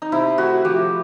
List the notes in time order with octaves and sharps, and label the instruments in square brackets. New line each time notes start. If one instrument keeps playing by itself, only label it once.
[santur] D#4
[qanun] C3 [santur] E4
[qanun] A3 [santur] F#4
[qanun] F3 [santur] G4